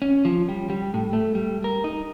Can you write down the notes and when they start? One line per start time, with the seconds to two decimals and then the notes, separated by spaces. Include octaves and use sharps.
0.02 C#4
0.25 F3
0.49 G3
0.70 G3
0.94 A2
1.13 A3
1.35 G3
1.64 A#4
1.84 D#4